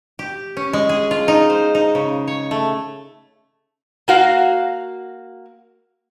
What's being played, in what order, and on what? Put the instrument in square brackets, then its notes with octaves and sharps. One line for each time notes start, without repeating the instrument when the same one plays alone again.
[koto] G4
C#4
G#3
G#4
F4
D#4
C5
D#4
C#3
C#5
A3
[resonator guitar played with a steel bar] A#3 F#4 F5